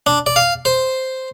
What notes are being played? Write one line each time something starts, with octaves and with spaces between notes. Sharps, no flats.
D4
D5
F5
C5